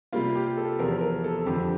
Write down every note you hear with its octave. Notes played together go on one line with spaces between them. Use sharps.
C3 G3 A#3 F4
G4
A4
E2 C3 F3 A#4
A#4
A4
F2 D3 G3 C4 G4